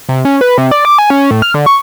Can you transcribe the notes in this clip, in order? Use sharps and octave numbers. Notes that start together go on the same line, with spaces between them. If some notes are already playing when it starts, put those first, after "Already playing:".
C3
C#4
B4
C3
D5
D6
G#5
C#4
A2
F6
D3
C#6